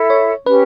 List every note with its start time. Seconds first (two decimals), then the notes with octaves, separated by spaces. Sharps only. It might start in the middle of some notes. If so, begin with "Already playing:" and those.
Already playing: E4 A4 E5
0.10 C#5
0.46 C#4 G4 B4